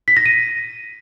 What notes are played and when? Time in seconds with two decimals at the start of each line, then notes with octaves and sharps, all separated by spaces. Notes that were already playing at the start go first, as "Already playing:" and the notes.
0.08 B6
0.17 A#6
0.26 D#7